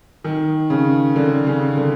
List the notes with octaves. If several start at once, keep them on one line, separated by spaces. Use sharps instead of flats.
D#3
C#3
D3
C#3
D3